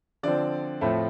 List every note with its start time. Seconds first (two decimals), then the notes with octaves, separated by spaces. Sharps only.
0.23 D3 F3 C4 D5
0.81 A2 F3 A3 C4